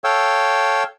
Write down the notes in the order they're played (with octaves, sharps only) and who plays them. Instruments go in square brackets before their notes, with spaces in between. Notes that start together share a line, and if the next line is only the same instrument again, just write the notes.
[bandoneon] A4 C#5 F5 G5 E6